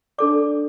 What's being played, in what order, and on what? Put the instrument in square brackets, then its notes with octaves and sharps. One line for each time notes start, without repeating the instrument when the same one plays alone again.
[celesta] D4 A4 D5 D6